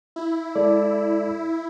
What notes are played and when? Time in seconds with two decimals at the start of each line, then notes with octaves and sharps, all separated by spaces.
0.16 E4
0.55 G#3 A4 D5